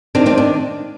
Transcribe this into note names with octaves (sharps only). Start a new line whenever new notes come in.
D#3 C4 D4
C4 D4
D4